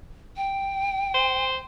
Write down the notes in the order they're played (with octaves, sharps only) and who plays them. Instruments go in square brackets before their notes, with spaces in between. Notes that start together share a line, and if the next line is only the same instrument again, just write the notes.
[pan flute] G5
[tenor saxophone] C5